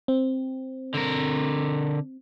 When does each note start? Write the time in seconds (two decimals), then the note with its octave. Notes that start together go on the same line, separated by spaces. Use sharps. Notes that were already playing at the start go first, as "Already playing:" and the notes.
0.08 C4
0.94 D3 A#4